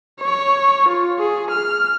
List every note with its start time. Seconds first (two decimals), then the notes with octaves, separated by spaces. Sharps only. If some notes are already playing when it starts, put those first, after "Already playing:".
0.20 C#5
0.89 F4
1.19 G#4
1.51 F6